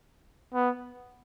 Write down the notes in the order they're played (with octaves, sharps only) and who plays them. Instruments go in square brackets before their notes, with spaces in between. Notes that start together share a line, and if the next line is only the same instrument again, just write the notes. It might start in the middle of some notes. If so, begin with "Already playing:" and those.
[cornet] B3